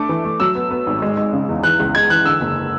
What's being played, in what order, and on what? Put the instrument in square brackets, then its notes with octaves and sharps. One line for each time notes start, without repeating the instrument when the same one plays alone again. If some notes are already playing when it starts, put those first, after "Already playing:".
Already playing: [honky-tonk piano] A3 D4 [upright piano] D6
[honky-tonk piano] E3
A3
[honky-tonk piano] F#3 [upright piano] E6
[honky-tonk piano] B3
B3
G#1
G#3
G#3
C#3
E2
[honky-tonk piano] E3 [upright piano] F#6
[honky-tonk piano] C#2
[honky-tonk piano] G#3 [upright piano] G#6
[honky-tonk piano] E3 [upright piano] F#6
[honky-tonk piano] D3 [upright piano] E6
[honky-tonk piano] F#1